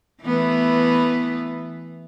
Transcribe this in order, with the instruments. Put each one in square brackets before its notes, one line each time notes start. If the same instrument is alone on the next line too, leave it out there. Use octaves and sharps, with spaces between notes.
[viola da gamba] E3 A3 B3